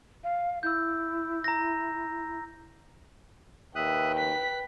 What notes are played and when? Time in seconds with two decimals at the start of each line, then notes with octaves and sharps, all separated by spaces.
0.24 F5
0.63 E4 E6 G6
1.44 A#5 A#6
3.76 D#2 B4 E5 G5 D#6 F#6
4.18 F#6 B6